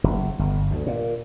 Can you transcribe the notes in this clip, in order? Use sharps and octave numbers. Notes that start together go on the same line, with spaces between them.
F#1
G1
D2
A#2